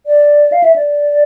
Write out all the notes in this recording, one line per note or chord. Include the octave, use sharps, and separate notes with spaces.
D5
F5
E5
D5